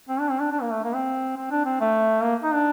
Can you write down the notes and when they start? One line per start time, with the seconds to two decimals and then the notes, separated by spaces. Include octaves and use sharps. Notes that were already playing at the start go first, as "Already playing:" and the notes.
0.09 C4
0.20 D4
0.30 C4
0.40 D4
0.52 D4
0.61 A#3
0.72 A3
0.84 A#3
0.95 C4
1.38 C4
1.51 D4
1.65 C4
1.80 A3
2.23 A#3
2.43 D#4
2.54 D4